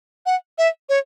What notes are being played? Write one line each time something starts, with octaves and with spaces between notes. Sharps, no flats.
F#5
E5
C#5